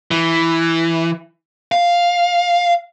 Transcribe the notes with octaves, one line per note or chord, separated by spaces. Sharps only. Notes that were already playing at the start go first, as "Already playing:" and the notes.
E3
F5